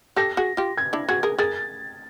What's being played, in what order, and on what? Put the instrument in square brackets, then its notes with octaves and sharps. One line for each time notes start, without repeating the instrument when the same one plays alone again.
[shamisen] G4 A4 [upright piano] A#6
[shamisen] F#4 G#4
F4 G4
[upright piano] G#6
[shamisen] D4 E4
[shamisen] F#4 G#4 [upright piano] G#6
[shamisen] G#4 A#4
[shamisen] G#4 A#4 [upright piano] A6